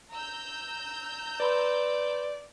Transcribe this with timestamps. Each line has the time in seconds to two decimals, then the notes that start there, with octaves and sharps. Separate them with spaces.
0.11 A#5 E6 G6
1.40 B4 D5 B5 C6